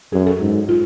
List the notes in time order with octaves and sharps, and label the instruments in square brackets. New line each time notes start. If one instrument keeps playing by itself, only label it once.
[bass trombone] F#2 [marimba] G#4
[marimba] A4
[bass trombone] G#2
[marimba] F4